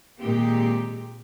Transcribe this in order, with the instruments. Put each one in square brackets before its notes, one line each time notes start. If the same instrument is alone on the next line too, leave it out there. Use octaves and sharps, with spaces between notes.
[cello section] A#2 D#3 G#3 C4 G4